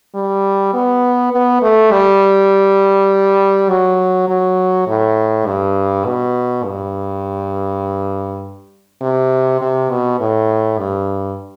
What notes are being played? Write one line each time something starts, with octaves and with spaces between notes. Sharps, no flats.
G3
B3
B3
A3
G3
F#3
F#3
A2
G2
B2
G2
C3
C3
B2
A2
G2